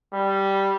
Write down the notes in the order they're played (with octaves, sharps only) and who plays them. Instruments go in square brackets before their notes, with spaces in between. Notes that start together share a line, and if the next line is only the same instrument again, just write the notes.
[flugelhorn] G3